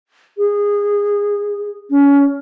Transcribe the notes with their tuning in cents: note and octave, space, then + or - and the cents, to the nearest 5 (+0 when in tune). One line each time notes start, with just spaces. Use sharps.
G#4 -20
C#4 +25